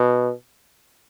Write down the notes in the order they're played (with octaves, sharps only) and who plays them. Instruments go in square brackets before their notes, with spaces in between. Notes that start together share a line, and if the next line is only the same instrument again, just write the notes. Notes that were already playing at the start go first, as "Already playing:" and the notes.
Already playing: [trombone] B2